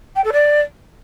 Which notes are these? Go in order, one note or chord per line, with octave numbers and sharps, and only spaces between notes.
G5
A4
D5